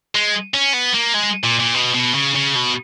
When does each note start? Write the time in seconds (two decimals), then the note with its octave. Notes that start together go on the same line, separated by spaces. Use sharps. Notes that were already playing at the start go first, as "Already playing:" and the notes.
0.15 G#3
0.54 C#4
0.74 B3
0.95 A#3
1.15 G#3
1.44 A#2
1.60 A#2
1.75 B2
1.94 B2
2.14 C#3
2.35 C#3
2.55 B2